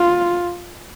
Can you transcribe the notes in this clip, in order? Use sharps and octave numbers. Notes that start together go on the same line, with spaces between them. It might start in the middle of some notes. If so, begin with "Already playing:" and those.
Already playing: F4